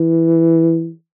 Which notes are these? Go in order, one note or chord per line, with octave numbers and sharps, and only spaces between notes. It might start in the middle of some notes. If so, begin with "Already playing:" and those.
Already playing: E3